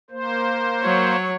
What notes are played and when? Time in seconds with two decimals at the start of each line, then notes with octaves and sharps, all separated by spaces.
0.11 A#3 C5
0.82 F#3 C#5